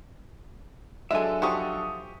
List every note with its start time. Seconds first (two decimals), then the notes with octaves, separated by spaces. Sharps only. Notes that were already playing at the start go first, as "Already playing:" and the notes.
1.11 F3 F#3 G#3 D4 A4 E5 G#5
1.42 F3 F#4 G4 C#6 D#6